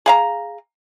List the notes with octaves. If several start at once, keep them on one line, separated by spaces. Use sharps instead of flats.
G#4 F5 A#5